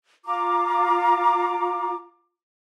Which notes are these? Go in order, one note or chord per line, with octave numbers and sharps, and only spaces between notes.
F4 A#5 D6